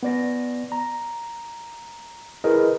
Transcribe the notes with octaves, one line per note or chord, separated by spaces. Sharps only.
B3 D5 A#6
A#5
E4 G#4 A#4 B4 D#5